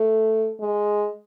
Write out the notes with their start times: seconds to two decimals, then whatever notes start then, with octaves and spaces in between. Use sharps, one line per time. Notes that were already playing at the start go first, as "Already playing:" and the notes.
Already playing: A3
0.61 G#3